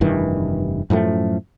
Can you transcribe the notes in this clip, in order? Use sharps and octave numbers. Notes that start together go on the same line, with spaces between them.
F1 G2 D#3 E3
F#2 A2 F3 A3